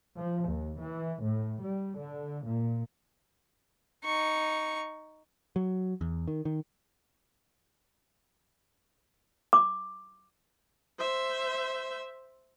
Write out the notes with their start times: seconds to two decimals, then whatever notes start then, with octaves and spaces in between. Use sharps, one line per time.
0.17 F3
0.49 D#2
0.81 E3
1.23 A2
1.63 G3
1.99 D3
2.46 A#2
4.05 D#4 C#6
5.56 F#3
6.01 E2
6.28 D#3
6.45 D#3
9.53 D6
10.98 C5 E5